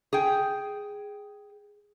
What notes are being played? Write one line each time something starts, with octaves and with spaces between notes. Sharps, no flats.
G#4 G5